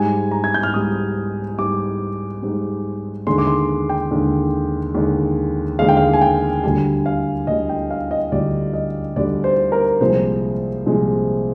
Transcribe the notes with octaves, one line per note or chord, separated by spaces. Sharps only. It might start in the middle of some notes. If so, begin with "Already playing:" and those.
Already playing: G#2 G3 G#5
A#5
G#6
G6
F6
G#2 G3 D#6
G#2 G3 D6
G#2 G3
D#2 D3 G#3 C6
D6
C6
G5
D#2 D3 G#3
D#2 D3 G#3
D#2 D3 G#3 F5
G5
F5
G#5
G5
D2 D3 G3 G#5
F5
D2 D3 G3 D#5
G5
F5
D#5
D2 D3 G3 D5
D#5
D2 D3 G3 D5
C5
A#4
C2 A#2 F3 G#3 C5
C2 A#2 F3 G#3